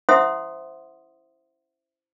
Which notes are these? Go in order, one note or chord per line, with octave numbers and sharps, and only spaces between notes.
E4 C5 E5 F#5 C6 D#6